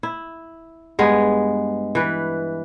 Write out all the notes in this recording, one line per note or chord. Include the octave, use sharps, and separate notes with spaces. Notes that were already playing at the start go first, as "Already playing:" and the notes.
E4
G2 G#3 B3
E3 B4